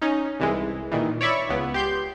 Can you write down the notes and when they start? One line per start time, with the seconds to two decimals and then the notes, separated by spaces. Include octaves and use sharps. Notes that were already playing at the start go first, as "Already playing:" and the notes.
0.02 C#4 D#4
0.40 C2 E3 G#3
0.91 A#2 D#3 E3
1.21 C#5 D5 E5 B5 C#6
1.49 C#2 B3
1.74 G4 C6 G6